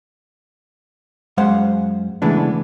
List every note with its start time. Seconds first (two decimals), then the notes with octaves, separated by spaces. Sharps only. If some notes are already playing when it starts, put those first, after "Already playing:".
1.37 F#2 G#3 C5 F5 F#5
2.22 C#3 E3 G#3 A3 B3 D4